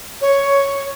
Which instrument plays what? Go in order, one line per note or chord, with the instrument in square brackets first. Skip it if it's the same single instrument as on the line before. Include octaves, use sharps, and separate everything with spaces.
[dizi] C#5